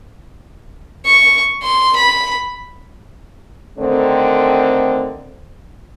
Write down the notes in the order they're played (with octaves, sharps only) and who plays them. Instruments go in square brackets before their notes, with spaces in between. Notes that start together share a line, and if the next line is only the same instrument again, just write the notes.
[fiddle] C#6
C6
B5
[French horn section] D3 D#3 A3 C4